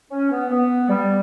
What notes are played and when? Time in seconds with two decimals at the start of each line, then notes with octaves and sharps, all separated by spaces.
0.11 C#4
0.31 B3
0.50 B3
0.88 G3